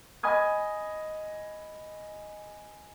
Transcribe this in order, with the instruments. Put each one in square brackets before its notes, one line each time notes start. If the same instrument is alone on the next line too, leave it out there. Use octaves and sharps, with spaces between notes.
[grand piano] D#5 G#5 B5 D#6 G#6